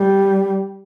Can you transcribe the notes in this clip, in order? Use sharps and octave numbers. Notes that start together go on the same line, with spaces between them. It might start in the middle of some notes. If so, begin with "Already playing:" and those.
Already playing: G3